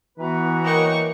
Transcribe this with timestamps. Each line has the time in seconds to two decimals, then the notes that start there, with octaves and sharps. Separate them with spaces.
0.18 E3 B3 F#4 B4 A#5
0.64 A#3 C#5 D#5 G5 C#6